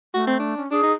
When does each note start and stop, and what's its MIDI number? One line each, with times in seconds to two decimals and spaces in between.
0.14 0.54 57
0.14 0.27 66
0.27 0.36 60
0.39 0.62 62
0.57 0.68 61
0.71 0.80 62
0.71 0.92 68
0.83 0.94 63